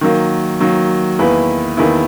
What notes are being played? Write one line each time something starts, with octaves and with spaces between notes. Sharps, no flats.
D#3 F#3 A#3
D#3 F#3 A#3
E2 D#3 A#3 E4 B4
E2 D#3 A#3 E4 B4